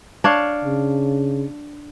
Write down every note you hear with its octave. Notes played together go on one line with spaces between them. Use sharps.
D4 C#5 F5
C#3